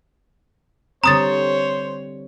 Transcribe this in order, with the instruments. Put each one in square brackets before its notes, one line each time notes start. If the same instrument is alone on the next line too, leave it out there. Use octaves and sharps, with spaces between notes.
[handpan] D3 G3 C4 [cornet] C5 [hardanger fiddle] C#5 [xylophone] A#5 D#6 A6